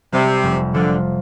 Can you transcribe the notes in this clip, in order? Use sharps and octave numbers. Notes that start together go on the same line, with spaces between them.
C3 G3
F1
D3 F3